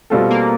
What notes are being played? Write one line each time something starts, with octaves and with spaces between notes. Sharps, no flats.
B2 G3 A3 C4 F4 A4
A#3